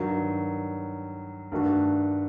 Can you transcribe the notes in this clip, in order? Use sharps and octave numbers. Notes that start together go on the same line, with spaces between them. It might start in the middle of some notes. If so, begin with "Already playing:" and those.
Already playing: G2 D#3 F#3
G2 D#3 A3 D4 F#4